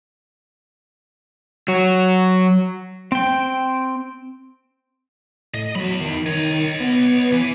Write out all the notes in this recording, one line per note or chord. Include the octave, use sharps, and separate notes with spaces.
F#3
C4 G5
A2 D#5
E2 F#3 B5
D#3
D#3 C#5 D#5
B3
E3